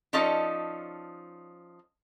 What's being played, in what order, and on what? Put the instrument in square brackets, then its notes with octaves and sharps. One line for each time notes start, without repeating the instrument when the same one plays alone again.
[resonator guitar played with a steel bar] F3 C#4 D#4 A4 D5 D#5